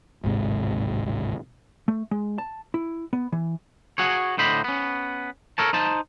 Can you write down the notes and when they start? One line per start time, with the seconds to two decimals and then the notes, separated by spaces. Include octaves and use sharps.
0.24 D1 G#1 G#2 C3
1.88 A3
2.11 G#3
2.38 A5
2.74 E4
3.13 B3
3.32 E3
3.98 F#4 G#4 C#5
4.38 A2 D3 C5 D#5 B5
4.64 B3 C#4
5.58 A4 A#4 C#5 A5
5.73 D#4 C5 A5